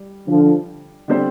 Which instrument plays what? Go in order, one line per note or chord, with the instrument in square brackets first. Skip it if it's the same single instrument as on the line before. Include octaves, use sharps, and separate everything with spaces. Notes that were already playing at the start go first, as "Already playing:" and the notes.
Already playing: [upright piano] G3
[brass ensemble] D3 F3
[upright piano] D3 G3 C4 G4 C5